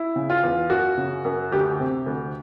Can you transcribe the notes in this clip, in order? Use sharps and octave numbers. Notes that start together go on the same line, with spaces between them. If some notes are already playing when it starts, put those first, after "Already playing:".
Already playing: E4
C#3
F4
E2
F#2 F#4
C#3
F#2
D2 G4
C3
D2